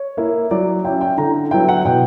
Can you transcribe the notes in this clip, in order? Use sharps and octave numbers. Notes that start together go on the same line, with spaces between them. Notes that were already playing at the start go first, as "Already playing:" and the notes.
Already playing: C#5
A#3 E4
F#3 D5
C#4 E4 G5
G5
D3 A#5
F#3 B3 E4 G5
F#5
B2 G5